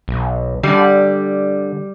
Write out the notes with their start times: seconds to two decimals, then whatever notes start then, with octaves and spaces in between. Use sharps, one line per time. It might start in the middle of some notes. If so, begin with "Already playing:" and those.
0.08 B1
0.63 D3 G3